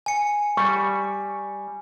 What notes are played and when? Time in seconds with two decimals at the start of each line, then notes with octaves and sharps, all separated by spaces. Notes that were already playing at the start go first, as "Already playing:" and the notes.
0.06 G#5 C#7
0.57 G3 C#6